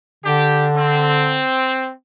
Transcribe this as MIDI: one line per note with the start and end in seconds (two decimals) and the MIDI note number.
0.24 1.44 50
0.24 0.69 62
0.24 0.69 67
0.76 1.92 60